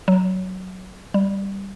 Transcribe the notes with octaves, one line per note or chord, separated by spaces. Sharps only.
F#3
G3